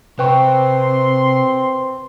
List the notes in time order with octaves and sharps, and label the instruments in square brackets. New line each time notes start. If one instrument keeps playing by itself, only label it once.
[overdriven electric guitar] C3 [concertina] C4 [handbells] B4 G5 C#6 [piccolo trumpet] C6